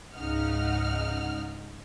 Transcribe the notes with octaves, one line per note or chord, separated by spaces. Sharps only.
C#2 G#2 C#3 D#4 F#5 F6